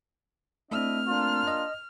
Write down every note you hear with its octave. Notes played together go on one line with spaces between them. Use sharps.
A3 C4 D4 E4 D#5 F6
A#3 D4 F4
D#5